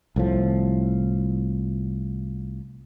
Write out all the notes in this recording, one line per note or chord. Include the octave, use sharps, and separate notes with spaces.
C2 A2 F3